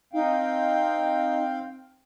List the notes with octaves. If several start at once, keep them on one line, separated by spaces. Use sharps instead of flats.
C4 D#4 F5 G5